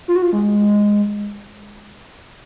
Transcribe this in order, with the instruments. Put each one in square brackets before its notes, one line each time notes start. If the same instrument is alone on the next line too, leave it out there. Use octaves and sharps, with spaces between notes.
[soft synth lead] F4
F#4
F4
G#3